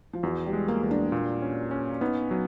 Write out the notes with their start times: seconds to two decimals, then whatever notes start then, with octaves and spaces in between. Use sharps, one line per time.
0.13 F3
0.23 E2 F#3
0.46 G3
0.53 G#3
0.68 A#3
0.83 E2
0.91 D4
1.12 A#2
1.42 C#4
1.71 C#4
2.01 B3 D#4
2.31 F#3